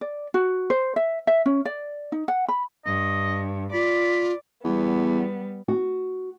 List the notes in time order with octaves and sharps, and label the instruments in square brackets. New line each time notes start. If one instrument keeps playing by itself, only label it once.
[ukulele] D5
F#4
C5
E5
E5
C#4
D5
D#4
F#5
B5
[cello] G2 [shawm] D#5
[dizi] F4 [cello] D5 [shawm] B5
[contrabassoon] E2 [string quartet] G3 B3
[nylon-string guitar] F#4